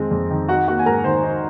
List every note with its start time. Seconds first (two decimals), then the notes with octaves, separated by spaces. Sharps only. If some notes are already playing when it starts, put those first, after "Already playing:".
Already playing: F2 D#3 G#3 C4
0.11 F2
0.30 D#3
0.48 D#4 F#4 F#5
0.68 A#3 F#4 F#5
0.79 G#5
0.86 G#2 A#4 A#5
1.04 D#3 C5 C6
1.23 D#4